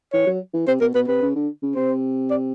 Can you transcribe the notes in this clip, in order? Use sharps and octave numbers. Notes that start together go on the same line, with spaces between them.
E3 C#5
F#3
E3
C3 C5
B2 A#4
B2 B4
C3 B4
C#3
D3
C#3
C3 C5
D5